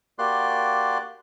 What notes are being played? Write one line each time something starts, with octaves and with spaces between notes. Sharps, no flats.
A#3 F#4 G4 D5 C6 F#6